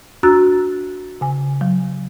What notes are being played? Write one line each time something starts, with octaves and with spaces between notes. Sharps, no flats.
D4 F#4 A#5 E6 F#6 A6
C#3 G#5
F#3